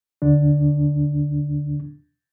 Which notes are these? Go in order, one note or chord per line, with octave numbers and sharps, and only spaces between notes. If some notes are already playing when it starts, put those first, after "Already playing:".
D#2 D3 D4